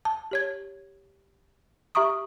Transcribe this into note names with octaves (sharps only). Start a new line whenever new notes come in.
A5
G4 C#5 G#6
G4 E5 A#5 C#6 D#6